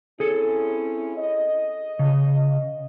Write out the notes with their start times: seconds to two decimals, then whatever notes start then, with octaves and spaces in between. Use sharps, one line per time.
0.20 C4 C#4 E4 G#4 A4
1.17 D#5
1.99 C#3